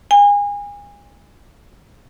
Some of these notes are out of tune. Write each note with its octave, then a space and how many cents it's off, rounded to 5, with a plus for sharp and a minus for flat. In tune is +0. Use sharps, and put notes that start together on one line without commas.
G#5 -30